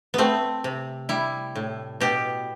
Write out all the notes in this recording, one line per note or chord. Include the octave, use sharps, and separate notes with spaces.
A3 B3 C4
C3
G3 E4
A2
B2 G4